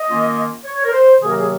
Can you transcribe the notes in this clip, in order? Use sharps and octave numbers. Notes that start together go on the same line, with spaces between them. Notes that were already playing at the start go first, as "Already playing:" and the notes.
Already playing: D#5
D#3 A#3 C#4 F4
C#5
A#4
C5
C3 D#3 F#3 A#3 G#4
A#4
G#4